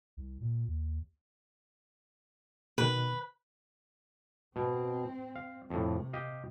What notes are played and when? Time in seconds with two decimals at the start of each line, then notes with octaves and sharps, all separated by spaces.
0.17 C2
0.41 A#2
0.67 D#2
2.78 B2 D#3 B4
4.56 B2 C4
5.36 F5
5.70 F2 A2 C3
6.13 G4 D#5 F5